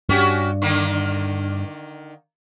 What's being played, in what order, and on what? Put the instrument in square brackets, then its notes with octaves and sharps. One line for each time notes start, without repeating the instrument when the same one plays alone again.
[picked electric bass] G2 [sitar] C#4 F#4 G4
[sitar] D3 D#3 A#3